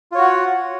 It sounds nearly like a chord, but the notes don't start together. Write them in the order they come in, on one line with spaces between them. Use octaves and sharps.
F4 C#5 F#4 F#5